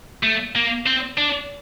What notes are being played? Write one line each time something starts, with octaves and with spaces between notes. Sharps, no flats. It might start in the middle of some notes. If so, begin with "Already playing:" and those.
A3
A#3
C4
D4